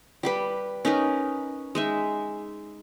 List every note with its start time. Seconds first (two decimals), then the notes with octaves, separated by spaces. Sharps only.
0.23 G3 G4 B4
0.85 C#4 D#4 A#4 B4
1.75 G#3 D#4 E5